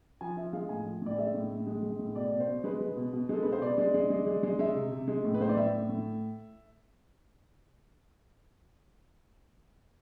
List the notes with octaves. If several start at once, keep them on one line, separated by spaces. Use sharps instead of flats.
F3 G#5
F3 E5
G#3 F5
A2 G#5
F3
A2 D5
G#3 E5
A2
A2
G#3
G#3
A2
B2 D5
B2
C5
B2
G#3 B4
G#3
B2
B2
G#3 A4
G#3 B4
C5
B2 D5
G#3
G#3
G#3
G#3
G#3
G#3 E5
C3
C3
G#3
A2
B4
A2 C5
D5
A2 E5
A2
A2